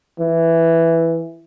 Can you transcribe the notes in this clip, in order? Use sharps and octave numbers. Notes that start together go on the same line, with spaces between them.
E3